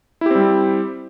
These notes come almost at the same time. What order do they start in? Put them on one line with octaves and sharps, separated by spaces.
E4 G4 C4 G3